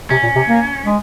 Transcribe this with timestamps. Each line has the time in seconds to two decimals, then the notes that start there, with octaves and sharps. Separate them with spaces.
0.10 C3 C#4
0.23 A#2
0.36 C3
0.49 A#3
0.86 G#3